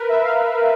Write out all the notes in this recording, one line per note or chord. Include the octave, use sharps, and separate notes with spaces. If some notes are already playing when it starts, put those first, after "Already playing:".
Already playing: A#4 B4
E5
F5